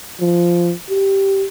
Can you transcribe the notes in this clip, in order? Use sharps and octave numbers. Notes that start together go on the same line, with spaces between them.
F3
G4